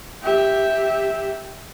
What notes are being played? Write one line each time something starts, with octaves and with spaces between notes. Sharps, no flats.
G4 E5